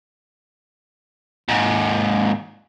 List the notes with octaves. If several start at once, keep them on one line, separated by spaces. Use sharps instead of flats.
D#2 G#2